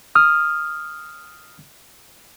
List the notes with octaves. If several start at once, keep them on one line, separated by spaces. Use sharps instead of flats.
D#6 F6